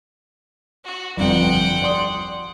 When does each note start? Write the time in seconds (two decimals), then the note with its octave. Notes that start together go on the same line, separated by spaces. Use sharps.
0.84 F#4
1.17 G1 F2 F#5 G5
1.82 D5 C6 D#6